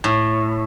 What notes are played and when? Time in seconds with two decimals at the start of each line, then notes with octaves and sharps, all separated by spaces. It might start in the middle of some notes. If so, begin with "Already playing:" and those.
0.04 A2